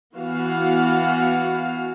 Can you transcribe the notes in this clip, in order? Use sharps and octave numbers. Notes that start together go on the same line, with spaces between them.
E3 B3 F#4 F5